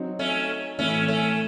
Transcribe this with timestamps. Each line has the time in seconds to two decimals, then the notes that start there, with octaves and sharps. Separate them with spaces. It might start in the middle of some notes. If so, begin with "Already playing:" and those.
Already playing: F#3 C4 D#4
0.19 A3 C#4
0.79 A2 E3 A3 C4 C#4
1.08 A3 C#4